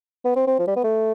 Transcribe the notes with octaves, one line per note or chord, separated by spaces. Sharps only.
B3
C4
C4
F3
G3
B3
A3